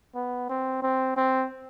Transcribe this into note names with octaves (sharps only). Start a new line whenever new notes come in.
B3
C4
C4
C4